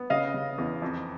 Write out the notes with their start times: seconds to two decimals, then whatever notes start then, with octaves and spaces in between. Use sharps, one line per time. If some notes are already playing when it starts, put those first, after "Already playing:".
Already playing: B3
0.10 C#3 D#5 F5
0.34 C#3
0.58 E2
0.82 F2